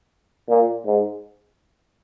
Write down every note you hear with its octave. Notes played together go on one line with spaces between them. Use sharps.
A#2
G#2